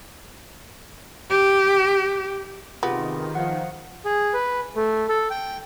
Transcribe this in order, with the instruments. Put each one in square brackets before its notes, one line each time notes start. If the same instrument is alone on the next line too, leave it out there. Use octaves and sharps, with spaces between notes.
[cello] G4
[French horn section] C3 [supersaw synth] D#3 [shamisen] B3 [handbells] F4 G4 G#4
[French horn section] F3 [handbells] F5 F#5
[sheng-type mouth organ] G#4
B4
A3
A4
G5